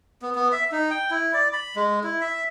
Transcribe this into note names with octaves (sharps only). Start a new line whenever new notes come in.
B3
B3
E5
D#4
G5
E4
D5
B5
G#3
E4
E5